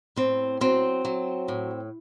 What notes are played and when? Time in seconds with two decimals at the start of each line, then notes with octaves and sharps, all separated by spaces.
0.16 A2 C4
0.61 F#3 C4
1.05 F#3
1.48 A2